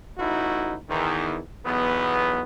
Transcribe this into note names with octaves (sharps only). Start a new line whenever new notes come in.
A1 D#4 E4 F#4
E2 D#3
B1 E2 B3